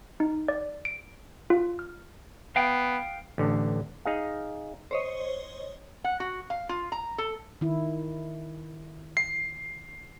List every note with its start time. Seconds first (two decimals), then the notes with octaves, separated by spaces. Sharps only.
0.20 D#4
0.48 D5
0.85 D7
1.50 F4
1.79 F6
2.56 B3 F5 G5
3.38 A1 D3
4.05 D#4 G#4 F5
4.91 C5 C#5 D#5
6.04 F#5
6.20 F#4
6.50 F5
6.69 F4
6.92 A#5
7.18 A4
7.61 D#3 E4
9.17 C7